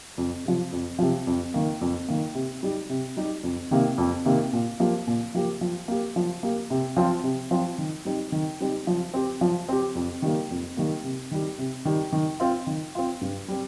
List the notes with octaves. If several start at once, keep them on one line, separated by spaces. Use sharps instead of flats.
F2
C3 F3
F2
C3 F3
F2
D#3 A#3
F2
D#3 A#3
C3
G3 D#4 G4
C3
G3 D#4 G4
F2
C3 D#3 A#3
F2
C3 D#3 A#3
A#2
F3 A#3 G4
A#2
F3 A#3 G4
F3
A#3 G4
F3
A#3 G4
C3
F3 C4 F4
C3
F3 C4 F4
D#3
G3 C4 D#4
D#3
G3 C4 D#4
F3
C4 G4
F3
C4 G4
F2
D#3 G3 A#3
F2
D#3 G3 A#3
C3
D#3 G3
C3
D#3 G3
D#3
C4 F4
D#3
C4 F4
G2
G3 C4